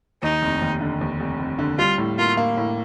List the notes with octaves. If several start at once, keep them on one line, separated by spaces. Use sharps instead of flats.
D#2 D#4
F1
D#2
D3
D#2
F1
F1
D3
G3 F4
A2
A#3 F4
A#3
A2